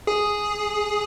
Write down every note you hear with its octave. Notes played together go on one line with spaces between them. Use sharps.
G#4